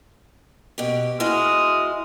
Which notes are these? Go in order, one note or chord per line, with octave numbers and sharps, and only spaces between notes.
B2 G4
G#3 E4 F#4 D#5 D#6 F6